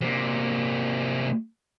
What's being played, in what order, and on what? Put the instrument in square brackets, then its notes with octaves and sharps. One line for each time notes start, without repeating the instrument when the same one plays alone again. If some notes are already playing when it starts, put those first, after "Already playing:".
[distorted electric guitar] C3 A#3